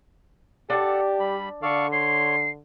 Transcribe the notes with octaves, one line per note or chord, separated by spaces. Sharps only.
D4 G4 A4 F#5 A5
G3 B5
D3 A4 D5 F5 C#6
C#5 C6 C7